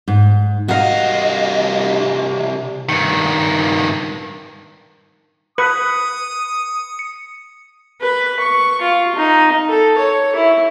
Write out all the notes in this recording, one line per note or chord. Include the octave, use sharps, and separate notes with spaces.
G#2
C2 F#4 D#5 F5
G2 D#3
B4 D#6 C#7
B4
C#6
F4
D#4
A4
C#5
E4